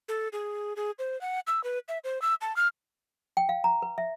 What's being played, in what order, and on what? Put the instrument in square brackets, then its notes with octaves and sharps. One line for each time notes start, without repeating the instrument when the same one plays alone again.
[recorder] A4
G#4
G#4
C5
F#5
E6
B4
E5
C5
E6
A5
F6
[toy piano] G5
F5
A#5
B4
E5